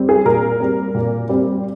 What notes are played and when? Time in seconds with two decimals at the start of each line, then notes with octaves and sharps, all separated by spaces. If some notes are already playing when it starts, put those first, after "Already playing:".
Already playing: G3 C4
0.09 G#4
0.25 A#2 A#4
0.60 G3 C4
0.95 A#2
1.29 G3 C4